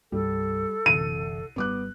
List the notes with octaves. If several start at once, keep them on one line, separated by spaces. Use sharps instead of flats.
C2 G2 G3 A4
F#1 C2 D3 E3 D#7
G#1 G3 B3 D6 F#6